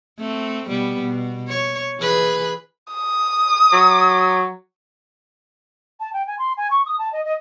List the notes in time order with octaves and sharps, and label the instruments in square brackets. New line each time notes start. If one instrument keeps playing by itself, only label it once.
[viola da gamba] A3 C4
B2 G3 B3
B2
C#5
E3 G#4 B4
[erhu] D#6
[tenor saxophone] F#3
[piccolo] A5
G5
G#5
C6
G#5
C#6
D#6
A5
D#5
D#5